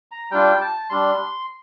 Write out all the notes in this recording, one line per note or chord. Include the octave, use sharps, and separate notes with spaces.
A#5
G3 D4 F4 G5
A5
G3 D4 C6